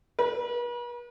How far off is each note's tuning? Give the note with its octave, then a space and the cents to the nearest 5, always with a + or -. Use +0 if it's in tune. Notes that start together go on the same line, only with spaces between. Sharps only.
B4 -45